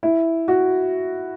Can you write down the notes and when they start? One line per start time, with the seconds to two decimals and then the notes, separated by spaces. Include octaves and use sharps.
0.03 E4
0.48 F#4